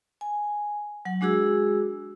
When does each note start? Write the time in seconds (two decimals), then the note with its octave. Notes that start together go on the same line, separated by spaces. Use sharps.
0.21 G#5
1.05 F#3 F#5
1.21 G#3 D4 F#4 G#4 E6